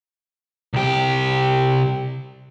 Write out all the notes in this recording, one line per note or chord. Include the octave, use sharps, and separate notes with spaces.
C2 G4